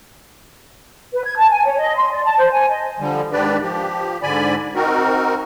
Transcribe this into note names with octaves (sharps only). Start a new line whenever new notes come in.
B4
G#6
A5
G#5
C#5
D#5
C6
D5
A5
C5
G#5
D#5
D3 F3 G3
G#2 D#3 D4 G4 B4 D5
F3 G4
G#2 D3 D5 G#5 B5
C4 D#4 F#4 A#4